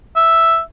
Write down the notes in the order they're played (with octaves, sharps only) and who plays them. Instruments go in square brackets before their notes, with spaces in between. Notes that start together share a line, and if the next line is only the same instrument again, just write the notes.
[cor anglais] E5